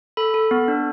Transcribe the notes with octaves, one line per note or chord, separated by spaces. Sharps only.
A4 B5
A4
B3
D4